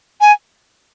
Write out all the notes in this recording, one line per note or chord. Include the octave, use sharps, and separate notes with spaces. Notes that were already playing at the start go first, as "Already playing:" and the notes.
G#5